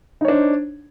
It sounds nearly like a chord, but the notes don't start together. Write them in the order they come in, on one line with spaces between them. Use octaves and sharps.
D#4 C#5 D4 C5